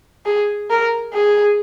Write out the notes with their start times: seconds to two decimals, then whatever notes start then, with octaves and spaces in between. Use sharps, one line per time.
0.26 G#4
0.70 A#4
1.14 G#4